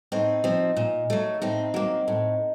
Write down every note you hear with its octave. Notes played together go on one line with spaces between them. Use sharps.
A2 C4 D#4
F3 C4
A#2
F#3 A3
A2 C4 D#4
F#3 A#3
A2